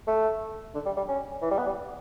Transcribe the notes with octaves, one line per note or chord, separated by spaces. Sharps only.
A3
D3
G3
G3
C#4
E3
G3
B3
G3